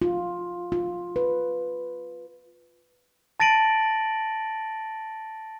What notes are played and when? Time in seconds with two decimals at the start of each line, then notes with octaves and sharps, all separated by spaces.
0.02 F4
0.72 F4
1.16 B4
3.40 A5 A6 A#6 D7 D#7 F#7